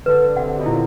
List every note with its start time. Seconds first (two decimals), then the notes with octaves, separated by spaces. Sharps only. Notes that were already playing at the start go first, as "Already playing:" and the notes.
0.06 D3 B4
0.36 C3 F#5
0.57 B2
0.65 A#2 E4